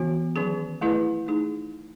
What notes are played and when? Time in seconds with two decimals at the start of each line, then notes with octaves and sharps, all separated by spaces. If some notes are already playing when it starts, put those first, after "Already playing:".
Already playing: E3 B3 F#4
0.36 D#3 F#3 C#4 G#4
0.81 A3 E4 G#4 B4 D#5
1.27 A3 D#4 G#4